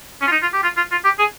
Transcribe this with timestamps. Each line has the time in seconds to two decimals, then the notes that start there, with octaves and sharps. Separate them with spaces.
0.22 C#4
0.27 F4
0.32 D#4
0.42 F4
0.54 G4
0.63 F4
0.77 F4
0.92 F4
1.05 G4
1.19 G#4